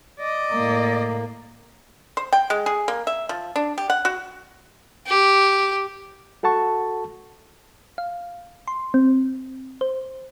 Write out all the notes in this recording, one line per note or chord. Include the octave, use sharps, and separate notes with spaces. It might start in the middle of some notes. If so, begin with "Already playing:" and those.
D5 D#5
A2 A#3
C5
G5
G#3
G#4
A#3
E5
F3
D4
G4
F#5
F#4
G4
F#4 A4 F#5 A5 C#6
F5
C6
C4
C5